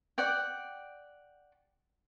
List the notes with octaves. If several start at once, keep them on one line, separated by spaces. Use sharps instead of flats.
D5 F#5 G5